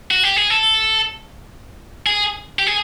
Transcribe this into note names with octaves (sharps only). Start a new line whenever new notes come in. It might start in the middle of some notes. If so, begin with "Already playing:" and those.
F#4
G4
G#4
A4
G#4
G4
G#4